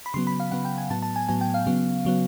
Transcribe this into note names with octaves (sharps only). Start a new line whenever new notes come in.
B5
C#3 F#3 B3 C6
B5
F5
C#3 F#3 B3 F#5
G5
G#5
A2 F#3 B3 A5
A5
G#5
A2 F#3 B3 G#5
G5
F5
C#3 F#3 B3
C#3 F#3 B3